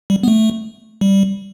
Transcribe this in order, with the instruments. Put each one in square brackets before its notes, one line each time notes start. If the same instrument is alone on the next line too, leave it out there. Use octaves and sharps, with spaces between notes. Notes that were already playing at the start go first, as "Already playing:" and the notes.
[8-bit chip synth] G3
B3
A3
G3